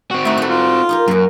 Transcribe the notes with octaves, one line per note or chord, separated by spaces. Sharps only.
C4 F#4
A3 D#4 E4
D#4 A4
F4
D#4 G4 A#4
F#2 A#3 F#4